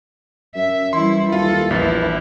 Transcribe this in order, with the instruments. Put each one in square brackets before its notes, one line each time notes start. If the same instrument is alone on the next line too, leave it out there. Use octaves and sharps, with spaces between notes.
[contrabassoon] F#2 [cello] E5
[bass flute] E3 [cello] G3 E4 [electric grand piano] C6
[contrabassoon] D#2 [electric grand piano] F4 [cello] A4
[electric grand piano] A#1 [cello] E2 E4 [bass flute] B4